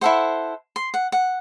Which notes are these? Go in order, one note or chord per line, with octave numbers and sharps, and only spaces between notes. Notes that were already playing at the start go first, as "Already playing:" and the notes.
E4 A4 C5 F#5
C6
F#5
F#5